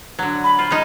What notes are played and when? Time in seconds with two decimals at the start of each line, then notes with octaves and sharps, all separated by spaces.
0.19 D3 F#3
0.44 B5
0.59 F4 C5
0.70 G#3 C#4 D#4